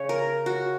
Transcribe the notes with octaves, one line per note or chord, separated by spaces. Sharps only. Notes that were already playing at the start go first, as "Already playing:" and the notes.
Already playing: C#3 C#5
A#4
F#4